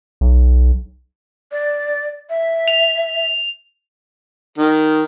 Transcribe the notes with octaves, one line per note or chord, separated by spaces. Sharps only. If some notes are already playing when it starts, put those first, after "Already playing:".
B1
D5
E5
F7
D#3